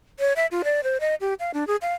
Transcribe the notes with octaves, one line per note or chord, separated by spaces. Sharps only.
C#5
E5
F4
D5
C5
D#5
G4
F5
D4
G#4
F5